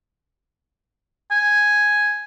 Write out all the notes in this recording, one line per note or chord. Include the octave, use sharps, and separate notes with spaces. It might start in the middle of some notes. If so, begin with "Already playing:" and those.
G#5